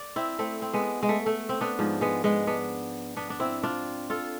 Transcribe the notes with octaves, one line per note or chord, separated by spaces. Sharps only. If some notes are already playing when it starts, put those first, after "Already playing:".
Already playing: D5
C4 E4
A3 C4
C4
G#3 B3
G#3
A3
A3
C4
B3 D4
G#2 F3
G#3 B3
G#3 B3
B3 D4
B3 D4
D4
C4 E4
D4 F4
F4 A4